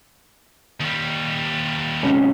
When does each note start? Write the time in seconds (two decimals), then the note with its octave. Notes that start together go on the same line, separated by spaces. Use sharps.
0.81 D#2 G3
2.03 G#2 C3 C#4